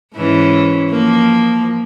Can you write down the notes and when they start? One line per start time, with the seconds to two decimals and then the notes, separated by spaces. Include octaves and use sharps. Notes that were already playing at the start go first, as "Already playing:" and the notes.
0.15 G#2 E3 C#4
0.90 F3 A#3